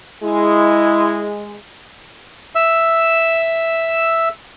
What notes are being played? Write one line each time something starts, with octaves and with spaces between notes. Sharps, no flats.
G#3 E4
E5 E6